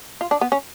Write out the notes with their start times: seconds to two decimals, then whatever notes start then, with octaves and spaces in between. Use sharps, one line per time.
0.21 F4
0.31 D4
0.41 B3
0.52 C#4